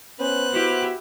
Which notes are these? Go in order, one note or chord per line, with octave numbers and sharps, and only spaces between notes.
B3 C#4 B4 C5 F#6
E4 F#4 G4